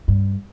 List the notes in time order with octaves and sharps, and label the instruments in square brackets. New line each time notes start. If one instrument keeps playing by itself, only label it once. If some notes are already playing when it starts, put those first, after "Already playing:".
[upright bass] G2